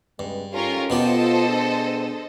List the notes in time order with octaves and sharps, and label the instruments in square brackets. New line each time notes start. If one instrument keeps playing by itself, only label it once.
[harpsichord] G2 [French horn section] C#3 G#3 B3
[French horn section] G#2 G4 A4 [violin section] C#4 F4 A#4
[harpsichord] B2 B3 G4 [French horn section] F4 [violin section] A4 C5 D#5
[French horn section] D4 G#4